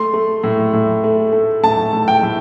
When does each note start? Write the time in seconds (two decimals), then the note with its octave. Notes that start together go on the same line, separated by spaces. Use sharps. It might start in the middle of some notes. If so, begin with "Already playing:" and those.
Already playing: A3 C6
0.13 A3
0.44 A2
0.73 A2
1.04 A3
1.33 A3
1.63 A2 A5
1.93 A2
2.08 G5
2.23 A2